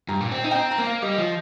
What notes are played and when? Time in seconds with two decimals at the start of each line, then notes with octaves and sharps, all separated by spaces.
0.08 G2 A#5
0.21 A#2
0.32 C4
0.44 D#4
0.51 G5
0.55 C4 A#5
0.71 A#5
0.78 A#3
0.86 F5
1.02 G3 D#5
1.18 F3